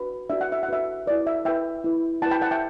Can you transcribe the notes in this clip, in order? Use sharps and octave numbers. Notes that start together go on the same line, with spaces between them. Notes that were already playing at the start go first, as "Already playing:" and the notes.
Already playing: D4 F#4 B4
D4 F#4 B4 E5
F#5
E5
F#5
D4 F#4 B4 E5
E4 B4 D5
E5
E4 B4 E5 G5
E4 B4
E4 B4 F#5 A5
G5 B5
F#5 A5
E5 G5